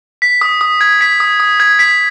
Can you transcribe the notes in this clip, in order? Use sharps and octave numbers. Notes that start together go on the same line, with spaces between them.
B6
D#6
D#6
G#6
B6
D#6
D#6
G#6
B6